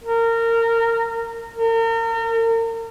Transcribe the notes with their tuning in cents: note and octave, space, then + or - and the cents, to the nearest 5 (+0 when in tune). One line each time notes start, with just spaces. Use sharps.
A#4 -20
A#4 -40